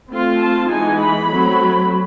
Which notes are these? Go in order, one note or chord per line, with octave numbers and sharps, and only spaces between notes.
A3 C4 F4
A5
E3 G#3 B3 D#4 G#5
B5
F#3 A3 C4